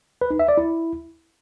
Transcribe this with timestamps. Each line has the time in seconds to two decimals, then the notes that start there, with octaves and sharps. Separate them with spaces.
0.21 B4
0.30 D#4
0.39 E5
0.48 D5
0.57 E4